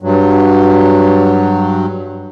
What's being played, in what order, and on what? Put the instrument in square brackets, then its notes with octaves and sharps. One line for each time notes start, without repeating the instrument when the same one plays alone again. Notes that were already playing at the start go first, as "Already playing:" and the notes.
[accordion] G2 F#3